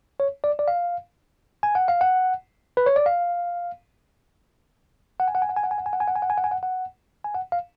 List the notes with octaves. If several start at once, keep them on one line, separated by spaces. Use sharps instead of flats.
C#5
D5
D5
F5
G#5
F#5
F5
F#5
B4
C#5
D5
F5
F#5
G#5
F#5
G#5
F#5
G#5
F#5
G#5
F#5
G#5
F#5
G#5
F#5
G#5
F#5
G#5
F#5
G#5
F#5
F#5
G#5
F#5
F5